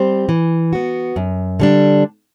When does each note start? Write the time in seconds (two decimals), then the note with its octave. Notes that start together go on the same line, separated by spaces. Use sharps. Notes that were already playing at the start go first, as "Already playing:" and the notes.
Already playing: G3 C4 G4 C5
0.29 E3
0.73 B3 F#4
1.16 F#2
1.60 D3 G3 D4